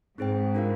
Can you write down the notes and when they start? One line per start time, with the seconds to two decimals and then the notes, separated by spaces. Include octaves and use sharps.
0.18 G#2 C4 D#4 G#4 C5 G5
0.55 D4 F4 A#4 F5